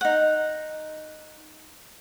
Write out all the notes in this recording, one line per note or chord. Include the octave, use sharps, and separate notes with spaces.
D#4 F#5